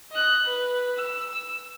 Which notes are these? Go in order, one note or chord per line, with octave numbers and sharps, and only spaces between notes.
D#5 F#6
B4
E6